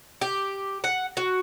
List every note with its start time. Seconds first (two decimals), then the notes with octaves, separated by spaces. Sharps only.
0.21 G4
0.84 F#5
1.17 F#4